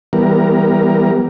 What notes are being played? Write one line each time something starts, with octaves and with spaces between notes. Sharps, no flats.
E3 G3 B3 A#4